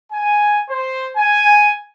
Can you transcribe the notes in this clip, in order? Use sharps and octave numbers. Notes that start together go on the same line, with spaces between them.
G#5
C5
G#5